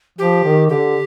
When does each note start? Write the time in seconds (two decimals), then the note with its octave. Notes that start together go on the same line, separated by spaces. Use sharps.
0.18 F3 G4
0.44 D#3
0.69 D3 G4